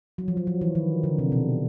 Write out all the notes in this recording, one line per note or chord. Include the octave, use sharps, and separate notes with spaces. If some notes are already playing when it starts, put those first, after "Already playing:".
F#3
F3
F#3
F3
E3
D#3
D3
C3
B2